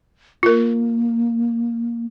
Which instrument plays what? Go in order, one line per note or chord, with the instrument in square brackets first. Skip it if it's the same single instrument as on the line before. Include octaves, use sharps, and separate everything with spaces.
[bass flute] A#3 [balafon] F4 A#4